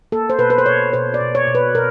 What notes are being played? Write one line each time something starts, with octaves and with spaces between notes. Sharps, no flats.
A#3 A4
C5
B2 B4
B4
C5
B2 C#5
B2 C5
D5
B2
C#5
B2
B4
B2 A#4